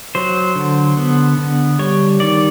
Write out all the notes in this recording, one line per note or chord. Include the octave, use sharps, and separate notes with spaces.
F#3 C5
D3
B3
D3
G3 C#5
D#3 D5